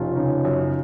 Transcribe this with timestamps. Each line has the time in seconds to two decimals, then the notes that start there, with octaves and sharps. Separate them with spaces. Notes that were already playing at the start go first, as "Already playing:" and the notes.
Already playing: F1 C#4 D#4 F4
0.16 C#3 D#4
0.45 F#2
0.59 C#4